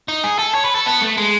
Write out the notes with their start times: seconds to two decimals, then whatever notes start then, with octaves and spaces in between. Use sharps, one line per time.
0.08 D#4
0.24 G#4
0.39 A4
0.55 C#5
0.65 B4
0.75 A4
0.86 B3
1.01 A3
1.18 G#3